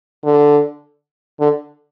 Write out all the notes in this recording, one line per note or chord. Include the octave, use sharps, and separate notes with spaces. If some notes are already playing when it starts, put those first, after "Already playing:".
D3
D3